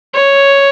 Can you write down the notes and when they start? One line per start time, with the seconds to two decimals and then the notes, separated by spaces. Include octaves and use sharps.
0.14 C#5